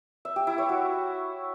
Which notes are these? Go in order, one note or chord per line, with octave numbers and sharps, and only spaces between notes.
E5
G4
E4
C#5
F#4